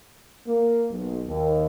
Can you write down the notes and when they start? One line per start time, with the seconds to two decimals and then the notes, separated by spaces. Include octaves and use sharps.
0.47 A#3
0.91 B1
1.26 D#2